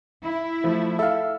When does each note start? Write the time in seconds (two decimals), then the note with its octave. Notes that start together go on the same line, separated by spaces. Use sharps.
0.25 E4
0.64 F3 A3
0.99 A4 E5 F5